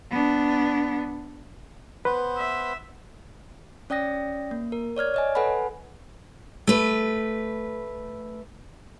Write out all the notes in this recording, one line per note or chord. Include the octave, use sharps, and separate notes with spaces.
B3 D4
B3 B4 C5
E5
C#4 D5 G5 D#6 A#6
A#3
A#4
C#5 D5 F6 G#6
C#5 D#5 G#5
A4 B4 F#5 G#5 B5
A3 B4